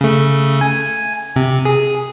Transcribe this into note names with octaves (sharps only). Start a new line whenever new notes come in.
C#3 A3
G#5
C3
G#4